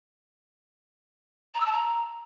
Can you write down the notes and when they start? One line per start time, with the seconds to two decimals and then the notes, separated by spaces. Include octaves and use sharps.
1.54 A#5
1.60 E6
1.66 A5
1.71 A#5